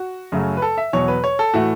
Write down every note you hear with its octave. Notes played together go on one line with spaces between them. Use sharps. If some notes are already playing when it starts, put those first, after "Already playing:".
Already playing: F#4
F#2 C#3 F#3 A3
B4
A4
E5
E2 B2 F#3 C#5
B4
C#5
A4
A2 E3 A3 F#4